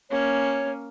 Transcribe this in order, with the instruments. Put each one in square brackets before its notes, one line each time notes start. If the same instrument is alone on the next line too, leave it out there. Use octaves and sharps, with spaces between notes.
[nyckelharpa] A#3 C#4 [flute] C#5